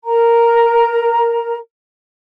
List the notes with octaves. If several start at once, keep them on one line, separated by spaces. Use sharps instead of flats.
A#4 A#5